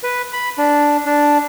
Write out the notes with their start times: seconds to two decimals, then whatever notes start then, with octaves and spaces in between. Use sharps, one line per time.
0.03 B4
0.33 B5
0.58 D4
1.06 D4